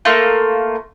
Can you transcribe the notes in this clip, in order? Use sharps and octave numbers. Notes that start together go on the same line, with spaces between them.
A3 A#3 F4